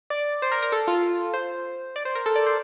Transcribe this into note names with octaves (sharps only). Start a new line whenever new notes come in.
D5
C5
A#4
A#4
A4
F4
C5
D5
C5
A#4
A4
D5
C5